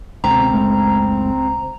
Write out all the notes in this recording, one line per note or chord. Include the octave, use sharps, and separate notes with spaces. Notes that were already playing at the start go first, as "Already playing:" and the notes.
C#2 B2 D3 C4 A#5
F#1 G#3 A3